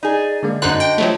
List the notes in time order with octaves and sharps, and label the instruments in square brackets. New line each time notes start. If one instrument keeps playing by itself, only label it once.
[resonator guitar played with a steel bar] D#4 G#4 [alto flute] D5
[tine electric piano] D3 G#3 A#3
[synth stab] F#2 D#4 F#6 [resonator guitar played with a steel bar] D3 [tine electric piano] F#4 C5 C6 [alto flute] D#5
[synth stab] G5
F3 F#3 A3